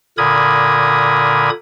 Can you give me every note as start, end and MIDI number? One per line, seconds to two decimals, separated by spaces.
0.18 1.50 46
0.18 1.50 50
0.18 1.50 70
0.18 1.50 83
0.18 1.50 87
0.18 1.50 92